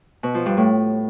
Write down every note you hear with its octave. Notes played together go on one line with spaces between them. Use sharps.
B2
F3
G2
A2